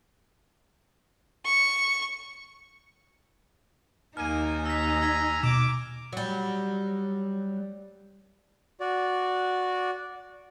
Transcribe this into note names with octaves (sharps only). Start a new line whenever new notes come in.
C#6
D#2 A#3 D#4 G#5 F6 D#7
G#5 A#5 E6 B6
E6 G#6 B6
B2 D6 F6 D7 E7
F#3 G3
F#4 D5